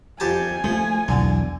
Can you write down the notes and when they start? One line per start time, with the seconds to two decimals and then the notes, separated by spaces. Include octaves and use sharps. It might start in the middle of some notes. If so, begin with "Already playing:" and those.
0.20 F2 G4 G#5 A5
0.64 F3 A3
1.08 B1 E2 D3